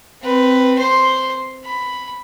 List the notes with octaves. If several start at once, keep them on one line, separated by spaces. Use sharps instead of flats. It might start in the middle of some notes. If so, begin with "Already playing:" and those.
C4 B4
C5 C6
B5